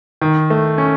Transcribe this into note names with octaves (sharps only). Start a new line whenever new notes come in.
D#3
A3
C#4